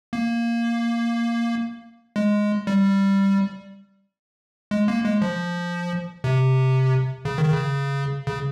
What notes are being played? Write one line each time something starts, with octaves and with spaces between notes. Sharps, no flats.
A#3
G#3
G3
G#3
A#3
G#3
F3
C3
C#3
D#3
C#3
C#3